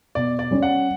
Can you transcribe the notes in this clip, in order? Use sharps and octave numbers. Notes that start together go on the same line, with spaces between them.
B2 D5
D5
G3 C#4
F#5